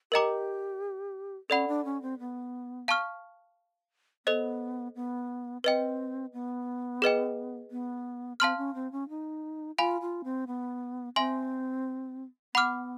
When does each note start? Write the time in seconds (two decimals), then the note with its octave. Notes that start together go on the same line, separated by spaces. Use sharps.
0.12 G4 A#4 D#5 G5 A#5 D6
1.50 C#4 A4 D5 F#5 B5
1.68 D4
1.85 C#4
2.02 C4
2.19 B3
2.88 F5 A5 C#6 F6
4.26 B3 A4 C5 D#5
4.95 B3
5.64 C4 B4 D#5 G5
6.33 B3
7.02 G#4 B4 D#5 G5
7.71 B3
8.40 C4 F5 A5 C6 F6
8.58 C#4
8.75 C4
8.92 C#4
9.09 D#4
9.78 F4 F5 G#5 B5
10.01 F4
10.24 C4
10.47 B3
11.16 C4 E5 G#5 C6
12.55 B3 F#5 B5 D6 F6